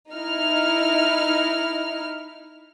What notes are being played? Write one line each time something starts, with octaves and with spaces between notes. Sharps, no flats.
D#4 E4 F6